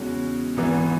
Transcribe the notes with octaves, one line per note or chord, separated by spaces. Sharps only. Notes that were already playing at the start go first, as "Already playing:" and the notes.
Already playing: E2 C#3 G#3 C#4 F#4
G#1 G#2 E3 B3